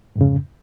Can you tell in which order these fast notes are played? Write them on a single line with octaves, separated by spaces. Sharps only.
G#2 F2 C#3